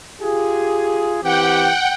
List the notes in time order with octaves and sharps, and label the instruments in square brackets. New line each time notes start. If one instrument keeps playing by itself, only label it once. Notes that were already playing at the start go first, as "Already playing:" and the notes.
[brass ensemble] F4 G4 G#4
[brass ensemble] E3 C4 G4 [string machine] F#5 G5